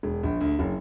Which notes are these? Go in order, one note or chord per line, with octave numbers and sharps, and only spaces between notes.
E1
A#1
D2
F#1